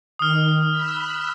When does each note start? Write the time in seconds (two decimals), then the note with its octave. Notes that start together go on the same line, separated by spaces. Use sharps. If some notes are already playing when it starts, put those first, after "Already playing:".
0.19 D#3 D#6 F6
0.71 B5 E6 F#6